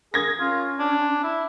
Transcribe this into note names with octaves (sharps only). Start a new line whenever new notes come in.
G#4 A#4 G#6 A#6
C#4 F4
D4
E4